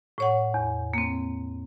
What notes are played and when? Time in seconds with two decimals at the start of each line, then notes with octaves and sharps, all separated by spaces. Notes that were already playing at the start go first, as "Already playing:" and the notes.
0.18 A2 C#5 F#5
0.54 E2
0.94 A#3 C4